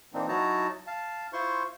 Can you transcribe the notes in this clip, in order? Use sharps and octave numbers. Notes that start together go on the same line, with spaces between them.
A#2 E3 A#3 C4 D4 D#4
F#3 D#4 E4 F#4 A5 A#5
F5 A5
E4 F4 C5 C6 C#6